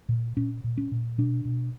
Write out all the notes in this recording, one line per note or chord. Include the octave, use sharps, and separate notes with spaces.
A#2
A#2 C#4
A#2
C#4
A#2
B2 D4
B2